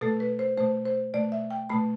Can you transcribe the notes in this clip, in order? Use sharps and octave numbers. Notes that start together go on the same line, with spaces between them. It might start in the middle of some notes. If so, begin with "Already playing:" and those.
B2 A3 A4
B4
C5
B2 A3 C5
C5
B2 A3 D5
E5
G5
B2 A3 B5